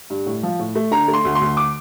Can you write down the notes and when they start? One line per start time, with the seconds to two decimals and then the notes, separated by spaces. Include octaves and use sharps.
0.10 G2
0.26 A2
0.43 F3
0.60 A2
0.75 A3
0.91 D3 A#5
1.08 A3
1.13 C6
1.25 D2
1.35 C6
1.41 D2
1.57 D6